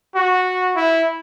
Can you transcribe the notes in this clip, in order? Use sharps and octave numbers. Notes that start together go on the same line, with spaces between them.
F#4
E4